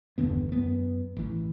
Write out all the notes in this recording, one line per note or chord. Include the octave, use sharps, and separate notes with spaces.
G1 E2 D3 B3
F#2 B3
A1 E3